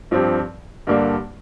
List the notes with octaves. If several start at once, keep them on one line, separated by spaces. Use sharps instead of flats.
G2 F3 C4 G4
G2 D3 G3 A#3 D4